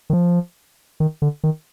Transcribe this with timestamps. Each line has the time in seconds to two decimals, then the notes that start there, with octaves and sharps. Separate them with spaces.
0.10 D#3
0.13 F3
1.00 D#3
1.22 D3
1.44 D#3